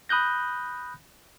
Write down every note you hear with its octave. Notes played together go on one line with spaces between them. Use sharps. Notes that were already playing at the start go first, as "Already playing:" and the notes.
B5 D#6 F#6 G6 A#6